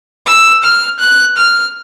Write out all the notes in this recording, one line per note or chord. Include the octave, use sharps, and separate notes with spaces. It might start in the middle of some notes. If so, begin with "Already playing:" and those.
E6
F6
F#6
F6